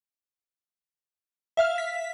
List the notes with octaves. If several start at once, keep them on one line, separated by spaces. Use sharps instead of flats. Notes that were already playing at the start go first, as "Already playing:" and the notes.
E5 F5 F6
B6